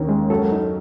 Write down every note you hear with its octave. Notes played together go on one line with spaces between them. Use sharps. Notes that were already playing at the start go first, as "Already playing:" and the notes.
Already playing: D#2 D#3 C#4
G#3
F#2 F#3 A4
D#4